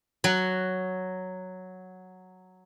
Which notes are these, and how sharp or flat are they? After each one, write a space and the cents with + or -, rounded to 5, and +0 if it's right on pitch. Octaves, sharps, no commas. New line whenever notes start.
F#3 +0 F#5 +0